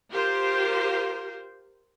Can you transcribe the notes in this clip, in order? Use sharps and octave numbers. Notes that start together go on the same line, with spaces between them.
F4 G4 A#4 C5